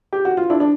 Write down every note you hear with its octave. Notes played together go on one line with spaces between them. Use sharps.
G4
F#4
F4
D4 E4
D4